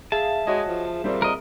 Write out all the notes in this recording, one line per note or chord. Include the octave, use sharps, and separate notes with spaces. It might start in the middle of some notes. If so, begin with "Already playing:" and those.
G#4 E5 F5 A5
G#3 F#4 C#5 D#5
F3
A#2 G3 C4
A#4 D#5